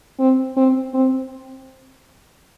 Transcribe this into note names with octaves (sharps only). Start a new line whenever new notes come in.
C4
C4
C4